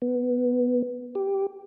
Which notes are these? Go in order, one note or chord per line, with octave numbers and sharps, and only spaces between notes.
B3
G4